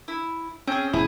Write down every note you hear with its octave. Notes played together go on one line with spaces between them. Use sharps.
E4
C4 C#4 G#4
E1 E4 G#4